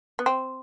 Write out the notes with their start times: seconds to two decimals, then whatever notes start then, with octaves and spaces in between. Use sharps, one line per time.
0.19 B3
0.26 C4